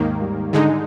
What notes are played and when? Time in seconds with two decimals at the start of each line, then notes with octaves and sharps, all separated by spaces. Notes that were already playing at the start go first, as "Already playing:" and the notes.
Already playing: D#2 G#2 D#3 A#3
0.22 G3
0.53 D3 D#3 G#3 D#4